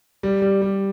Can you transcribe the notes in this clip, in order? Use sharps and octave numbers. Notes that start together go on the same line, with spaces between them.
G3
G3
G3